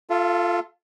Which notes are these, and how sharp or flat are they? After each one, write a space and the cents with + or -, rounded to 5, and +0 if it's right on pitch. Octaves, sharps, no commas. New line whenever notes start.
F4 +0 A4 +0 E5 +45